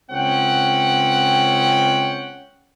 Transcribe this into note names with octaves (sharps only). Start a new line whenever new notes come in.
C#2 C4 C#4 F#5 G5